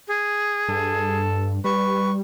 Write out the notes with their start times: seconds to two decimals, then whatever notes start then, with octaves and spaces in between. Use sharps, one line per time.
0.08 G#4
0.68 G2 A4
1.64 G3 B4 C#6